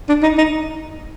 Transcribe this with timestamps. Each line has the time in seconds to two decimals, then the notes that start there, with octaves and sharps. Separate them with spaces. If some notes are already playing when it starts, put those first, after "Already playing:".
0.09 D4
0.23 D#4
0.38 D#4